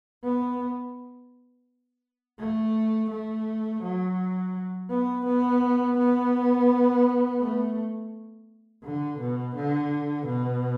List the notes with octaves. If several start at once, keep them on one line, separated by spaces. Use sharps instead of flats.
B3
A3
A3
F#3
B3
B3
B3
A3
D3
B2
D3
B2